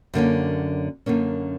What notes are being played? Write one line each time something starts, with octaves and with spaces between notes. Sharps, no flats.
F#2 D3 A#3 C#4
F#2 D3 A#3 C#4